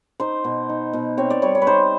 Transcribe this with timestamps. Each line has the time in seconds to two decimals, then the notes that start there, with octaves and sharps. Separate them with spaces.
0.20 D#4 C5
0.44 B2
0.69 D#4
0.93 B2
1.18 C4 C#5
1.30 D5
1.42 G3 C#5
1.55 C#5
1.62 B4
1.67 D#4 C5